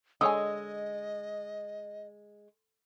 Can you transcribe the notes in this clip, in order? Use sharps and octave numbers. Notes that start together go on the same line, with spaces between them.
D3 G#3 C#5 D#5 G#5 D#6 E6